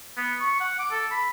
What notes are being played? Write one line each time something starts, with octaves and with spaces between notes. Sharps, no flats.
B3
C#6
F#5
D6
A4
B5